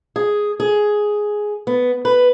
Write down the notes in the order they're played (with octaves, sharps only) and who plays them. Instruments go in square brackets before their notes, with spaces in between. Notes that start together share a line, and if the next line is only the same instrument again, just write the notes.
[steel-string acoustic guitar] G#4
G#4
B3
B4